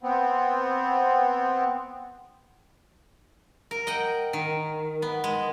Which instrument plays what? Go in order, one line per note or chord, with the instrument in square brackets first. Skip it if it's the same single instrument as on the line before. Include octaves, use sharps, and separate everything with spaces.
[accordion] B3 C4
[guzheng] A#4
D#5 F#5 G5
D#3
B3
G#3